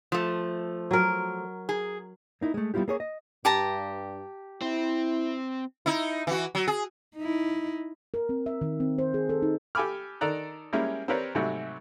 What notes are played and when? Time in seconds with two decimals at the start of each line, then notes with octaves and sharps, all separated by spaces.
0.12 F3 A3
0.91 F#3 A#4
1.69 G#4
2.41 A#3 D#4 E4
2.54 G#3 A3
2.74 G3 B3 E4 F4 G4
2.88 A#3 G#4 C#5
3.00 D#5
3.45 G2 G4 A5 A#5
4.61 C4 E4
5.86 D#4 E4
6.27 E3 F#4
6.55 F#3
6.68 G#4
7.17 D#4 E4
8.14 A#4
8.29 C4
8.46 E5
8.61 D#3
8.80 C4
8.98 C5
9.14 G#4
9.29 A4
9.42 D#4
9.75 G4 A4 G#5 B5 D6 F6
10.21 D#3 A4 D5 A#5 F#6
10.73 G3 G#3 A#3 C#4 E4
11.08 C4 G4 A#4 B4 C#5 D5
11.35 G#2 C3 F#3 G3 A3 F#4